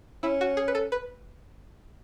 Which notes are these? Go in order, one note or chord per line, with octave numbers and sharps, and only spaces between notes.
C#4 E4
F#4
G#4
B4
A4
B4